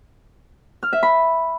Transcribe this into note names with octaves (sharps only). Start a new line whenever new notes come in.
F6
E5
B5